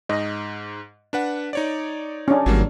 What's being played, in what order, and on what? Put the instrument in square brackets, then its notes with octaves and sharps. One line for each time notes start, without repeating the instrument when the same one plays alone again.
[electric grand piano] G#2 [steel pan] D#5
[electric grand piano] D4 B4 F#5
D#4 C#5 D5
[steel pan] C#4 D4
[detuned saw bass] G#1 [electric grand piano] F#3 G3 A#3